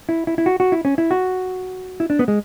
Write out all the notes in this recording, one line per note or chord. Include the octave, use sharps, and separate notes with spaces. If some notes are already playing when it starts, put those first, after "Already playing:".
E4
E4
E4
F#4
F#4
E4
C#4
E4
F#4
E4
D4
B3
G#3